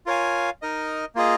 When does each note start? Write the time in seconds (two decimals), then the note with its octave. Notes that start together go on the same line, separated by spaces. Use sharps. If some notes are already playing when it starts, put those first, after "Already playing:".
0.06 F4 A#4 C#5 F5 G#5
0.62 D#4 A#4 D#5
1.15 A#3 F4 G#4 D#5